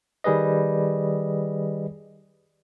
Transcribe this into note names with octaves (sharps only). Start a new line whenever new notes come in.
D#3 G3 G#4 B4 D#5